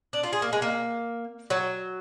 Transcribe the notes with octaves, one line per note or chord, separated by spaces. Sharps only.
D4
F4
G#4
A#3
G#3
A#3
F#3